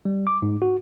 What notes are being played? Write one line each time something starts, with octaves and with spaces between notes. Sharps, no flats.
G3
D6
G#2
F#4